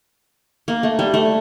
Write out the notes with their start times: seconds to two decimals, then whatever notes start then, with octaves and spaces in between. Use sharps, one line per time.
0.68 A#3
0.83 A3
0.99 G3
1.14 A3